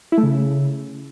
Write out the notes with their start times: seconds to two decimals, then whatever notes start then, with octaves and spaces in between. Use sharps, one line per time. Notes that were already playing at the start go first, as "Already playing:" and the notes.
0.12 E4
0.18 A3
0.23 C#3